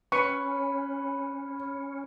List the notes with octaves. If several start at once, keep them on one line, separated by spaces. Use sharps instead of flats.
C#4 B4 C#5 B5 C#6